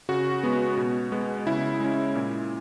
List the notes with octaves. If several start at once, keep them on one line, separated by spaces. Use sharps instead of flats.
C#3 F#4
G#3 B3
B2
G#3 B3
C#3 E4
G#3 C#4
A#2